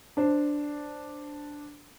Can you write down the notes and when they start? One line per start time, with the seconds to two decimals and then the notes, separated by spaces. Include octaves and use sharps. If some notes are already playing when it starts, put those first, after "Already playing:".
0.17 D4 C5